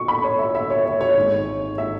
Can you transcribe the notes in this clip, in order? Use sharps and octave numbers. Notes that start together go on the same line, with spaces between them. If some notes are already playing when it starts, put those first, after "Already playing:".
Already playing: B2 C#6
B5
C#5
E5
E5
C#5
C#5
C#5
G#1 G#2 G#3
E5